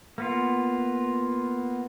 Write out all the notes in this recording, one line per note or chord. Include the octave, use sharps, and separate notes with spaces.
A#3 B3 F4